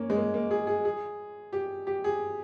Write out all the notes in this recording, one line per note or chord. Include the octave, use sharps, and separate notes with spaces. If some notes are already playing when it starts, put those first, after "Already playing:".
Already playing: A#3 C#4
G#3
A#3
A#3
G#4
G#4
G#4
G4
G4
G#4